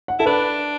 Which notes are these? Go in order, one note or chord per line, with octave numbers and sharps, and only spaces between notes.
F#5
E4 A4
D4 B4